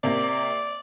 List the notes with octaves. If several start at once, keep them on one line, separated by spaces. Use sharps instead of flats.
C3 A#3 D5